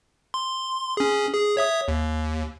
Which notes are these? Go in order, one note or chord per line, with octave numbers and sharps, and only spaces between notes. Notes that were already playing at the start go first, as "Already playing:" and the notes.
C6
C#4 G#4
G#4
C#5 E5 D#6
D#2